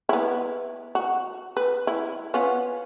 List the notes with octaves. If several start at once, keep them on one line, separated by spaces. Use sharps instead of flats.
B3 E4
F#4
B4
E4
B3 C#4 F4